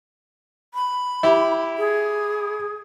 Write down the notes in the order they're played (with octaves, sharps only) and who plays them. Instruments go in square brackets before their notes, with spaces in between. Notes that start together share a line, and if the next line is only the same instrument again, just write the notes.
[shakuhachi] B5
[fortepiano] E4 G4
[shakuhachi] G#4